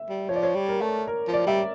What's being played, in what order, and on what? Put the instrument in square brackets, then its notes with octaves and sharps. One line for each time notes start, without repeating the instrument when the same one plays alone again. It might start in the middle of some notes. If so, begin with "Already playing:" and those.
Already playing: [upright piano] E5
[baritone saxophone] G3
[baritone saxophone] F3 [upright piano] C#5
[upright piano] D5
C#5
[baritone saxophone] G3
[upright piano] A#4
[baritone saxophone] A3
[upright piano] A#4
[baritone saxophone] F3
[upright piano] D5
[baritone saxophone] G3 [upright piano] E5